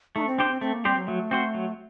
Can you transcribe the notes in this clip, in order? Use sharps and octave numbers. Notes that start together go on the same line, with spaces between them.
A3 D#4
D4
C4
C4 D4 G4 C5
C4
A3 C4
A#3
G3 C4 G4 C5
F#3
F#3 A3
C4 F#4 C5
F#3